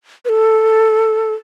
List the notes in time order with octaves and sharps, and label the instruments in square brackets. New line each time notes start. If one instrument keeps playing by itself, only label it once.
[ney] B4
A4